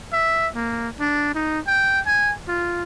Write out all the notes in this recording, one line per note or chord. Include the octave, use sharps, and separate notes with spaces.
E5
A#3
D4
D#4
G5
G#5
F4